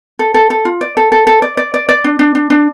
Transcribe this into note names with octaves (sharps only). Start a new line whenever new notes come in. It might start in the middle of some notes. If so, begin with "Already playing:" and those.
A4
A4
A4
F4
D5
A4
A4
A4
D5
D5
D5
D5
D4
D4
D4
D4